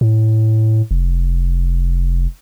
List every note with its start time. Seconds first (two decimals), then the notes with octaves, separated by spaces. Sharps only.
0.01 A2
0.91 F1